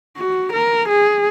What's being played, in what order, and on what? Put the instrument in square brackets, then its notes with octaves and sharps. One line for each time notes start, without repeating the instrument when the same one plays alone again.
[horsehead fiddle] F#4
A#4
G#4